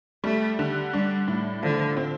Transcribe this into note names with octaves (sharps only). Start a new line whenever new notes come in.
G3 A3
D3
G3 D4
A2
D3 F3
C4